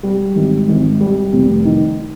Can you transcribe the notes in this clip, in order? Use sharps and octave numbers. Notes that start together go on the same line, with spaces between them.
G3
G#1
G#1
G3
F1
D#3